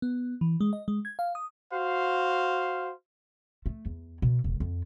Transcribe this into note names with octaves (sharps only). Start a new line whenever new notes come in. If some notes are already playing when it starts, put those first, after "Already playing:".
B3
E3
G#3
D#5
G#3
G#6
F5
D#6
F#4 C5 F5
A3
E2
B2
E1
F2